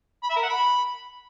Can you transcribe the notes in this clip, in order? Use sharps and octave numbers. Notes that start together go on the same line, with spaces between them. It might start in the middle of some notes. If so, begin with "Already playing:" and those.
B5
E5
A#4
F#5
B5